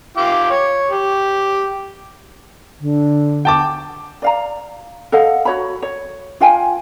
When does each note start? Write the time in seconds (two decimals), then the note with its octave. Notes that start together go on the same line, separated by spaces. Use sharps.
0.17 F4 G5 D6
0.51 C#5
0.91 G4
2.81 D3
3.45 G5 A5 D6
4.22 D5 F5 A#5
5.12 A4 D#5 F5 F#5
5.45 F#4 C#5 B5
5.82 C#5
6.40 F4 F5 G5 G#5